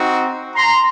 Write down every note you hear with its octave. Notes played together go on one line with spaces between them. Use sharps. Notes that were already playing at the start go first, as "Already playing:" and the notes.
Already playing: C4 D#4 F#4
A#5 C6